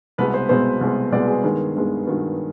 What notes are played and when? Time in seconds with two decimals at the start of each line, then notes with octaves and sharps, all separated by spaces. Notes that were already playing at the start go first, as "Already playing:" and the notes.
0.18 C2 B2 G#3 B3 B4
0.34 C5
0.49 C2 B2 G#3 B3 C5
0.81 C2 B2 G#3 B3
1.12 C2 B2 G#3 B3 D5
1.28 G#4
1.43 G2 D#3 G#3 B3
1.76 G2 D#3 G#3 B3
2.06 G2 D#3 G#3 B3 F#4